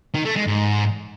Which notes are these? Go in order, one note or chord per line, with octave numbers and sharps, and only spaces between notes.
D#3
A3
G#3
G#2